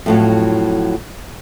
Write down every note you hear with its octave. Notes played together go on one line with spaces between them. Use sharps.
F2 A2 F#3